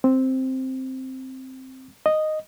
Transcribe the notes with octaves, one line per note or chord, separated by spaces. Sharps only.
C4
D#5